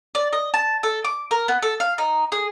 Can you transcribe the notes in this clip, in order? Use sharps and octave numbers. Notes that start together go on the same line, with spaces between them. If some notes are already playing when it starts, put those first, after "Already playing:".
D5
D#5
A5
A4
D6
A#4
B3
A4
F5
D#4
G#4